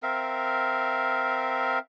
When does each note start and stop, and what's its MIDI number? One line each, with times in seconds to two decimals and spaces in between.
0.03 1.79 60
0.03 1.79 70
0.03 1.79 76
0.03 1.79 77